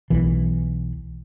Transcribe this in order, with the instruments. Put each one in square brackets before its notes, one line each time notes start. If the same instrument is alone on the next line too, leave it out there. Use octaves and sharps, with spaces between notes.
[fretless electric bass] B1 E3